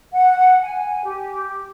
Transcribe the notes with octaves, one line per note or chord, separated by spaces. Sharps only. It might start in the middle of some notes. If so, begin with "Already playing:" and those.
F#5
G#5
G4